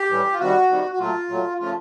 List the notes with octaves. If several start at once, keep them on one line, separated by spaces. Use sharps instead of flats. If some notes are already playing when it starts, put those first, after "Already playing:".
Already playing: G4
A2 E3 G3
F4
C3 D#3 G3 F#4
C3 D#3 G3
F#4
A#2 F#3 A3 F4
A#2 F#3 A3
C#3 F3 A3 F4